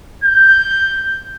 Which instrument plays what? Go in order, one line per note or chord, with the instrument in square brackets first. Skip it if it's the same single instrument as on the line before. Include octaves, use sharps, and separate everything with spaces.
[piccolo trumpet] G6